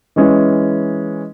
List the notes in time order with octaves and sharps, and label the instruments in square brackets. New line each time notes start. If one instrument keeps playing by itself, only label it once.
[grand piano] E3 G#3 C#4 E4